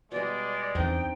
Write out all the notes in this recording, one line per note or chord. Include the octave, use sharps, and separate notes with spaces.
B2 G3 G#3 D5
E2 C4 D4 D#4 G5